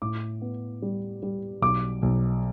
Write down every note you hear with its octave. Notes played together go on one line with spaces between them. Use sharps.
A2 D6
B3
G3
G3
B1 D6
B1